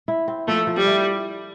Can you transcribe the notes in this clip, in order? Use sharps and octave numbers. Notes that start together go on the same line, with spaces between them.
E4
C4
F3 A3
F3
G3
E4